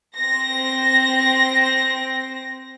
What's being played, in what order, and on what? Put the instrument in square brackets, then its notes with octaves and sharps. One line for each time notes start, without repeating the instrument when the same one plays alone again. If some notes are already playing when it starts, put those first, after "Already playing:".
[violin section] C4 A#6